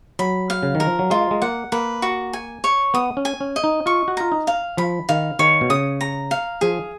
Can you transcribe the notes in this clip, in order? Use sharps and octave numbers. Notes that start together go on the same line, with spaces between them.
F#3 B5
F5
C#3
D#3
A#4
F3
F#3
G#3 F4
G#3
A#3 F#5
A#3 B4
F#4
G#5
C#5
B3 D#6
C#4
G#5
C#4
D#5
D#4
F4 C#6
F#4
F4 A#5
D#4
F5
F3 B5
D#3 F5
D#3 C#5
B2
C#3 D#6
A#5
F5
F3 G#4